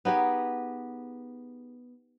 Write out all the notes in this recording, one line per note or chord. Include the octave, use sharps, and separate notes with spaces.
B3 D#4 G4 G#4